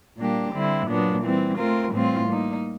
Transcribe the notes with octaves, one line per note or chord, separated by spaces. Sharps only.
A#2 G3 A#3 D4 G4
D3 G3 C4 E4
A#2 F#3 B3 D4
E3 G3 C4
A3 C4 F4 A#4
A2 E3 G3 C4 F4
G3 A#3 D#4